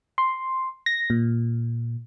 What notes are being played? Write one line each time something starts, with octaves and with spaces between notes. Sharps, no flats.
C6
A#6
A#2